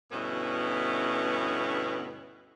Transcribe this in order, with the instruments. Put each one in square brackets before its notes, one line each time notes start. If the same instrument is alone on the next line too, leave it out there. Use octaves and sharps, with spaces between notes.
[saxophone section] D2 G2 B2 B3 C#4 E4